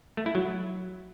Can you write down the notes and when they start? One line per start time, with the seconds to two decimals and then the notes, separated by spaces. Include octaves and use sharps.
0.17 A3
0.26 E4
0.35 F#3